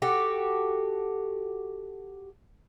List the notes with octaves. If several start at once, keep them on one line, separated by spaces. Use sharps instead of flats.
F#4 G4 A4